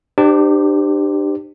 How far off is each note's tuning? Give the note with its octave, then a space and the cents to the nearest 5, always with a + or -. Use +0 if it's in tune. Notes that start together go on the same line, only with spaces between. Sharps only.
D4 +35 G4 +0 C5 -15